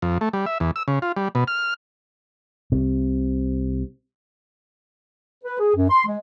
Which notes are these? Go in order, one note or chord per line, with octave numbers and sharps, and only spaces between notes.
F2
A3
G3
E5
E2
E6
C#3
F4
G3
B2
F6
C2 C3
B4
G#4
F#2
C6
G#3